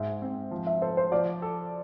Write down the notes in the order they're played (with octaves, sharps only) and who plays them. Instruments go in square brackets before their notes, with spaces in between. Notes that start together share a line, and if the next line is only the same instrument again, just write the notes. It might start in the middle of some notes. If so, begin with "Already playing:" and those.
Already playing: [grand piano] G#2 [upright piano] E5
[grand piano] C4
F3
[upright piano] E5
[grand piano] A4 [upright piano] C5
[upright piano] C5
[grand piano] F3 [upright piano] D5
[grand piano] A4